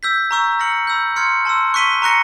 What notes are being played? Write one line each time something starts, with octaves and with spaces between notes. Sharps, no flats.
E6 G6 B6
A#5 C#6 E6 G6
F6 A#6 C#7 F#7
B5 E6 G6
C6 F6 G#6 C#7
A5 C6 E6
C#6 F#6 B6 D#7 G7
A#5 C#6 F#6 A#6 C#7